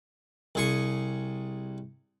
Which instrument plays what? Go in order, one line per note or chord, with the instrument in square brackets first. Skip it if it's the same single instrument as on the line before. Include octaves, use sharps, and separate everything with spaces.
[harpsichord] C2 G#4 C#6